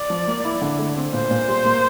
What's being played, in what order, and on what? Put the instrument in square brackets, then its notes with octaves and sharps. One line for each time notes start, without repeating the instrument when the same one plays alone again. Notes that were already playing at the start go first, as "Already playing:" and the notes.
Already playing: [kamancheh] D5
[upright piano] F3
A#3
E4
D3
A3
C4
[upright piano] A#2 [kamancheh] C5
[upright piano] A#2
G3
A#3